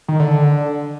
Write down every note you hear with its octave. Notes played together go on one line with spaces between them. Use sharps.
D#3
D3
D3